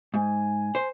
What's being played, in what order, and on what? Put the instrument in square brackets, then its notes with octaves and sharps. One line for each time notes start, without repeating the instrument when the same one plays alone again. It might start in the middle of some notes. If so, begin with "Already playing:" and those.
[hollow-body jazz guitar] G#2 [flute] G#5
[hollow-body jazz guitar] C5